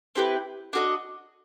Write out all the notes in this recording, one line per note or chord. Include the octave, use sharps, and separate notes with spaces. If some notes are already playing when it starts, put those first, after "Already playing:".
C4 E4 G4 B4
D4 F#4 A#4 D#5